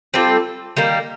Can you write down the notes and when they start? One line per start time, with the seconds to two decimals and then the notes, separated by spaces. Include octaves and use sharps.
0.14 G3 C4 F4 A4
0.77 D#3 G3 A#3